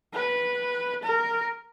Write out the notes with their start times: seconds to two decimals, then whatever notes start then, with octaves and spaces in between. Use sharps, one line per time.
0.14 B4
1.04 A#4